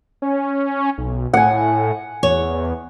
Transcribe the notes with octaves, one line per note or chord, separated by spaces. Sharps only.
C#4
B1
A2 F#5 G#5
E2 C#5